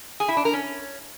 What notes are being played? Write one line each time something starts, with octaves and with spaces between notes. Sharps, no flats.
G#4
E4
D4
A#4
C#4